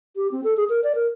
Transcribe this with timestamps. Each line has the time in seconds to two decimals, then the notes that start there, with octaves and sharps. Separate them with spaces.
0.16 G4
0.31 C4
0.44 A4
0.57 G#4
0.69 A#4
0.84 D5
0.95 A#4